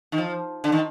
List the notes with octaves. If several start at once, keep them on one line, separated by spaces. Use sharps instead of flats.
D#3
F3
D3
D#3